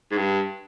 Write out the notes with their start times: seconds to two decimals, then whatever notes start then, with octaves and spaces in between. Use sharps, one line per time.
0.11 G#2
0.17 G2